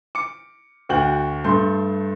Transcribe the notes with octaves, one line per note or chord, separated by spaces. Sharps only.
D6 C#7
D2 F#4 G5 G6 F#7
G2 A3 C6 G6